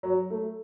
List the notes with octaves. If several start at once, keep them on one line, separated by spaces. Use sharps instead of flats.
F#3
A3